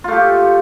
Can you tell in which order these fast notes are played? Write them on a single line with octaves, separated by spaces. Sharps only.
F4 A3 G4